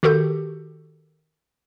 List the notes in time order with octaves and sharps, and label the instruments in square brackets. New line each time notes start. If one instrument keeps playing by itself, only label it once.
[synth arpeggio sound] D#3 F#4 G4 A4 G6